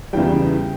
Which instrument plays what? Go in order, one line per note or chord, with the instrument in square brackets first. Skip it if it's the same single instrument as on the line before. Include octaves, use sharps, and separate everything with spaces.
[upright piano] E2 C#3 E3 G3 G5